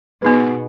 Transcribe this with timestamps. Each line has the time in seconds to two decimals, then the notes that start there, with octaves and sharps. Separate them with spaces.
0.22 B2 B3 D#4 G#4 B4